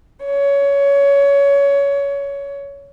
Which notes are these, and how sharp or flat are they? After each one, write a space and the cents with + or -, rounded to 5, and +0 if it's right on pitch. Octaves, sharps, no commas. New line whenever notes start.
C#5 +20